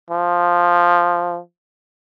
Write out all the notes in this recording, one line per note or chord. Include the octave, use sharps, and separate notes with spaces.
F3